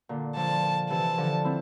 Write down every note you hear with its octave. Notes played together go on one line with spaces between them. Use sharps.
A#2 D3
D3 F3 A5
C3 E3 A5
D3 F3
C4 E4